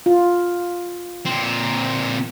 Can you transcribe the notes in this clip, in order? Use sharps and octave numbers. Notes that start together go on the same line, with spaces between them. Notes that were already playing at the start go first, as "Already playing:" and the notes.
F4
A#2 C4